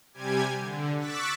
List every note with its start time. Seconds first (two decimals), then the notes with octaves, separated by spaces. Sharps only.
0.13 C3 G3 G4 G#5 G#6
0.58 D3
0.97 C#6 D6 E6 F#6 A6 B6